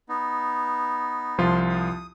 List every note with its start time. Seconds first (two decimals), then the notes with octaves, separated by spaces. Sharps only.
0.09 B3 D#4
1.38 C2 F3 F4 C6
1.69 D#6